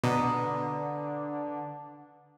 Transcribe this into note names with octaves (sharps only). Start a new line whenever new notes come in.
B2 D3 D4 B4 A#5 D#6